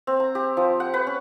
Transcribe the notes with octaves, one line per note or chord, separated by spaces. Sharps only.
C4
A#5
G4
F3
F#5
B4
C#4